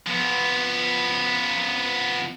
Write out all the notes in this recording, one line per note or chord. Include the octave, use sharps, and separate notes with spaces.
F3 B3